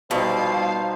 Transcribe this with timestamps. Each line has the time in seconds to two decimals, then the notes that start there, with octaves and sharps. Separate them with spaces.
0.11 B2 F3 G3 D#4 C5 F5